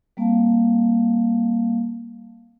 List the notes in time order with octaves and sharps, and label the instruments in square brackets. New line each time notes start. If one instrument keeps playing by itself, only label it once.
[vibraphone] G3 A#3 C4 F5 A5